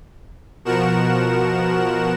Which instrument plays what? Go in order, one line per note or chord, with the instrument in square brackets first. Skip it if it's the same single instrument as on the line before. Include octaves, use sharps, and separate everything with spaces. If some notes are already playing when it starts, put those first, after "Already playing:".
[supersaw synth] B2 F3 F#4 A#4 F#5 E7